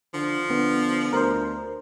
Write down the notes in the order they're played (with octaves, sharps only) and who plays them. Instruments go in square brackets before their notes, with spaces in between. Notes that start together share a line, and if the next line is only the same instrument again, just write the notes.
[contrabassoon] D3 [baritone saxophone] F3
[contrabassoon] D3 [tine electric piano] B3
[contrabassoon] D2 [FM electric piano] A#4 C5